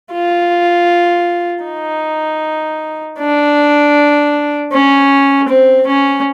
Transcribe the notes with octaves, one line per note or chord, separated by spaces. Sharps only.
F4
D#4
D4
C#4
C4
C#4